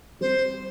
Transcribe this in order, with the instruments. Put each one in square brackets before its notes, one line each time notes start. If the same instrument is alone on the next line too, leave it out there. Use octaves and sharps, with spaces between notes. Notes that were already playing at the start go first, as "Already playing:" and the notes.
[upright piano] G3 C4 [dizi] C5